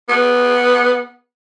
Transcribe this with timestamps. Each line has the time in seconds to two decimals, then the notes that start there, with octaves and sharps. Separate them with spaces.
0.09 B3